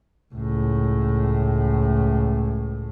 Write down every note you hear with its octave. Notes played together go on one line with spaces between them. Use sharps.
C#2 A2